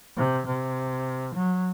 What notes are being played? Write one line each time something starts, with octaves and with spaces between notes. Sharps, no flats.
C3
C3
F#3